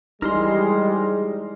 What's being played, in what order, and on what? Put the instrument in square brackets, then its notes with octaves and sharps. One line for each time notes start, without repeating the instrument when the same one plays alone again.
[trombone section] G3 G#3 [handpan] D#4 E4 G4 [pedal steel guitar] A#4 C5 C6